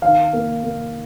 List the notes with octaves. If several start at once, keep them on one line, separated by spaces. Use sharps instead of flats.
D#3 F5
A#3
A#3